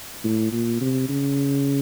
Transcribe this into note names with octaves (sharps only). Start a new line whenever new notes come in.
A2
A#2
C3
C#3